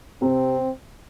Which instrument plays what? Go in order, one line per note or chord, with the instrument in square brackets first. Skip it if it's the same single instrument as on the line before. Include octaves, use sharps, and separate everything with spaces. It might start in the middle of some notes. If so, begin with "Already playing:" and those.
[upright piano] C3 [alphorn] C4